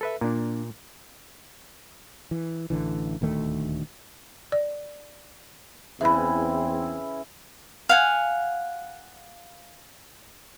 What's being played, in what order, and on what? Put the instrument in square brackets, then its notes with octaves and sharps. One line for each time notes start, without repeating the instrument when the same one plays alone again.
[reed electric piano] A4 B4 E5
[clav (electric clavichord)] A#2 [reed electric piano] A#3 D4
[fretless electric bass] E3
A1 D3 E3
D#1 D2 D#3 A3
[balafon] D5
[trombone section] E2 C4 [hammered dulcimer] C#3 E3 E4 [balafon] E5 B5
[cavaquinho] F5 F#5 G#5